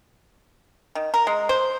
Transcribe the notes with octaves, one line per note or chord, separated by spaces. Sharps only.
D#3
A#4
G#3
C5